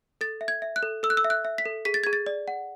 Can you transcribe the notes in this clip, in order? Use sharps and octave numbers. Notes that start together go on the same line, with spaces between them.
A4 A6
E5
G#6
E5
F#6
A4
A4 E6
F#6
E6
E5
F#6
E5
B6
A4
G#4 B6
A6
G#4 G#6
A6
D5
F#5